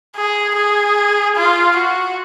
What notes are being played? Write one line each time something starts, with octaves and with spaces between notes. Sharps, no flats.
G#4
G#4
F4
F#4